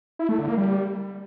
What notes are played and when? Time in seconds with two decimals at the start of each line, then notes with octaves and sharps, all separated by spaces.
0.19 E4
0.29 A3
0.38 D3
0.48 A#3
0.58 G3